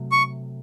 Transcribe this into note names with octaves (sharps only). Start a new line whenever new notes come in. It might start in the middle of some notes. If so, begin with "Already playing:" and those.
Already playing: C3 F#3 A3
C#6